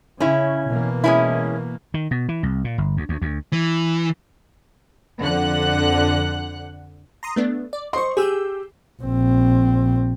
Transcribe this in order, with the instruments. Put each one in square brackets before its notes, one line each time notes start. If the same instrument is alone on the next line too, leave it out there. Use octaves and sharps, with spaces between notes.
[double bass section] C#3 [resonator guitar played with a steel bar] C#4 E4
[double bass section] B2 E3 A#3
[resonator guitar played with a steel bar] G#3 C#4 E4
[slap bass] D#3
B2
E3
C2
A#2
G1
D2
D2
D2
[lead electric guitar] E3
[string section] F2 D3 F#5 F#6
[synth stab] A#5 C6 D#6
A3 B3 D4
D5
[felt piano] C5 C6 [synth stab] D#5 C#6
[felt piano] G4 [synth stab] G#4 E6 G6
[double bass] A#1 C4